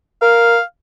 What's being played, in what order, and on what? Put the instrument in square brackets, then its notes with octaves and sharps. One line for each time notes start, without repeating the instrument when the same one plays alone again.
[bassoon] A#4 [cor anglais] F5